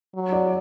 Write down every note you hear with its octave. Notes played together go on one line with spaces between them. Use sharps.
F#3
D5